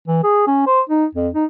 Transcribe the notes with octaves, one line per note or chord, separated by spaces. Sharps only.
E3
G#4
C#4
C5
D#4
F2
D#4